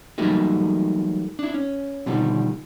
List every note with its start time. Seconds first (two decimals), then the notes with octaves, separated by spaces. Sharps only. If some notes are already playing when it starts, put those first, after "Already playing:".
0.18 E3 F#3 G3 A3 A#3 D#4
1.39 D4 E4
1.54 C#4
2.06 B2 D3 D#3 F3 G3